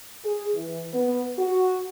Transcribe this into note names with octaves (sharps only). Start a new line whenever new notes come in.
G#4
E3
B3
F#4